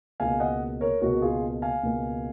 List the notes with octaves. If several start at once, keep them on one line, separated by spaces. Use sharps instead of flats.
C#2 B2 A#3 F5 G#5
D#5 F#5
A#4 C#5
C#2 B2 A#3 F#4 A#4
F4 G#4
F5 G#5
C#2 B2 A#3